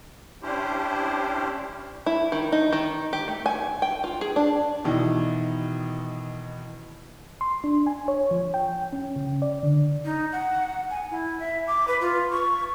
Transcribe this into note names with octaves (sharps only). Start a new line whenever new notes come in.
C#4 D4 E4 G4 C5
E4
D#3
D#4
D#3
G4
A3
G#5
G5
F4
G#4
D4
B2 D#3 E3
C6
D4
G#5
C#5
F3
G5
C#4
C#3
D5
D3
D#4
F#5
G#5
E4
E5
D6
B4
F4
C#6